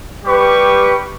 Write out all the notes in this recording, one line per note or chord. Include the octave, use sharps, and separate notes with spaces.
G3 G4 B4 C#6